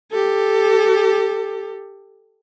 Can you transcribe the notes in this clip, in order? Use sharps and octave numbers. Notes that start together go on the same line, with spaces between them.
G4 A4